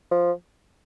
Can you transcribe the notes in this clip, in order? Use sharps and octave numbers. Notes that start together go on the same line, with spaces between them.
F3